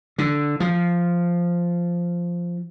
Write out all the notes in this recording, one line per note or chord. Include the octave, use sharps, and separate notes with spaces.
D3
F3